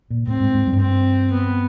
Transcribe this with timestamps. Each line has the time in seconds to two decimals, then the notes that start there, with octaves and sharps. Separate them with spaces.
0.10 A#2
0.27 A2 C4
0.40 G#2
0.54 G#2
0.67 G2
0.80 C4
1.32 B3